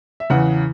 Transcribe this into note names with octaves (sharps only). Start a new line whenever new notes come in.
E5
E2 C#3 E3 F#5